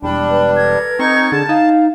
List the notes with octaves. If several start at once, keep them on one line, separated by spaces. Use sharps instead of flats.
E1 G3 D4 G5 B5
B4
A4 A#4 G#6
C4 D#4 C#6
D3 G#4 A5
D#4 F5